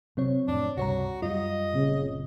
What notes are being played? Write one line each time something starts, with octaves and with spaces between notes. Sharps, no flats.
C3 F#3 C4 C#5
F2 A2 D4
C#2 G2 C3 G3 F#4 C#5 A#5
F#2 G3 F4 D#5
F#1 A#2 C#3 C4